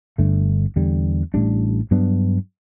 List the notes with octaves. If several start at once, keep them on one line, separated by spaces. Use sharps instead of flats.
G1 G2 D3 A3
E2 D3 G3
A1 A2 G3 D4
G2 F#3 B3 D4